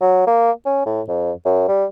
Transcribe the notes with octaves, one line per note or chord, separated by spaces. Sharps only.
F#3
A#3
C#4
A2
F2
F#2
G3